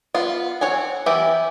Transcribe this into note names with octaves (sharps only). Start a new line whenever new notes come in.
B3 F4
C4 C#5 F#5 G#5
E3 B3 G4 E5